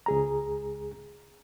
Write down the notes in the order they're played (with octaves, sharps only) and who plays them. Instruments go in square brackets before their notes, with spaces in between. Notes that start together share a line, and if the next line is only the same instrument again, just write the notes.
[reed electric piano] C#2 G#4 A#5